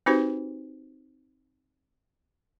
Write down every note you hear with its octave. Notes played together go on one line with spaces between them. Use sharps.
C4 D#4 F#4 G4 B4 C5